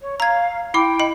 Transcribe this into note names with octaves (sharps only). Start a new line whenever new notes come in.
C#5
F5 A#5 G#6
E4 G5 B5 D6
D#5 B5